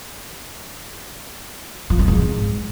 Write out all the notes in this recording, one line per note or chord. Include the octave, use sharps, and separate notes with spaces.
F3
F#2
G#2